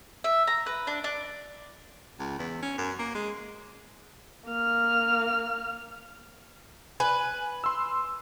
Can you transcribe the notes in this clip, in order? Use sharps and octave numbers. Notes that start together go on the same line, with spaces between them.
E5
A#5
B4
D4
D4
C#2
E2
C#4
F#2
A#3
G#3
A#3 F6
B4 G#5
C6 E6